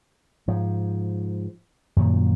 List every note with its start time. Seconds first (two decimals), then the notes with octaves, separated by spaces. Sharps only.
0.48 G#2 F3
1.96 F#2 A#2 D#3 F3